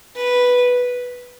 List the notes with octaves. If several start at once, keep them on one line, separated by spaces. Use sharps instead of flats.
B4